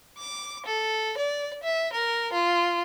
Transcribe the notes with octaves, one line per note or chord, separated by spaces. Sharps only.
D6
A4
D5
E5
A#4
F4